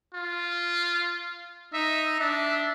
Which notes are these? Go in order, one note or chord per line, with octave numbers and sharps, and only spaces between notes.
F4
D#4 E5
D4 E5